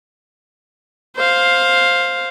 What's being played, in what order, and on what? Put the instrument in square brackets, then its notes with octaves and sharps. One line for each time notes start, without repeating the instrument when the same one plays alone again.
[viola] C5 F5